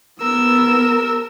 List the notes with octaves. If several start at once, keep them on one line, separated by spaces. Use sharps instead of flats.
B3 A#4 E6